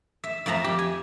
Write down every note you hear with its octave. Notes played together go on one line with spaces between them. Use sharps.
E5
F2 F3 E5 A#5
G4
G#5